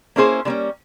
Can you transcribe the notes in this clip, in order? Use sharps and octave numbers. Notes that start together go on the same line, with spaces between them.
A#3 C#4 E4 G#4 C5
D3 G3 A#3 C#4